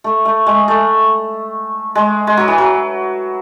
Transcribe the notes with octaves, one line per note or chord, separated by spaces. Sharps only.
A3
A3
G#3
A3
G#3
G#3
F#3
E3
F#3